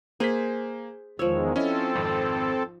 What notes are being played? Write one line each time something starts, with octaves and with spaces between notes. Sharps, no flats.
A#3 G#4 C5 B6
E2 D#3 F3 G#3 C#5 E6
C4 C#4 E4 A4 D#5
G#1 F2